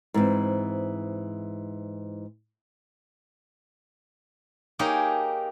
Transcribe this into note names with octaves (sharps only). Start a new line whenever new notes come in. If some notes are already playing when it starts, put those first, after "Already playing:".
G#2 E3 C4
A#3 D#4 G4 G#4 C#5